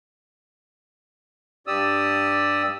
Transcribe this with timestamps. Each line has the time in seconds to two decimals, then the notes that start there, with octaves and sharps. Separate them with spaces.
1.67 G2 G4 D5 D#6 E6